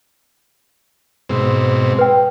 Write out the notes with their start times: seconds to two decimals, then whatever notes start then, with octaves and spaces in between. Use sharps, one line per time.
1.29 G#2 B2 C4
1.99 B4 G5